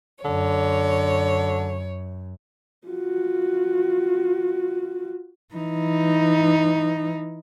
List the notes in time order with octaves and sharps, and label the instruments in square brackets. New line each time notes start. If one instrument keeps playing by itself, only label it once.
[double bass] F#2 [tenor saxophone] D3 [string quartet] C#5
[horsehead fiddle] F4 F#4
[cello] E3 D#4